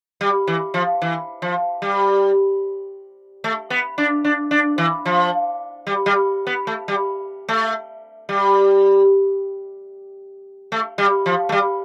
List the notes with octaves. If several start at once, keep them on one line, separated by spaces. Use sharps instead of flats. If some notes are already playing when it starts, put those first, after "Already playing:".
G3
E3
F3
E3
F3
G3
A3
B3
D4
D4
D4
E3
F3
G3
G3
B3
A3
G3
A3
G3
A3
G3
F3
A3
G3